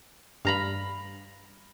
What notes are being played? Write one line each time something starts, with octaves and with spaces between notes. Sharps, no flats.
G2 F5 A#5 B5